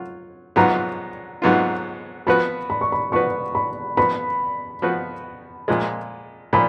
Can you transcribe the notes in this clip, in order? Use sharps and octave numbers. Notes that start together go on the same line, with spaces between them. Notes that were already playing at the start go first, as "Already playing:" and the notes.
Already playing: F#3 F4
G#2 F#3 B3 F4 A#5
G#2 F#3 B3 F4
F3 B3 F#4 B4 B5
B5
C#6
B5
F3 B3 F#4 B4 C#6
B5
F3 B3 F#4 B4 B5
F3 B3 F#4 B4
A#2 F3 G#3
A#2 F3 B5